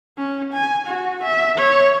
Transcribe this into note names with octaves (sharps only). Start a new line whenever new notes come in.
C#4
G#5
F#4
E5
C#5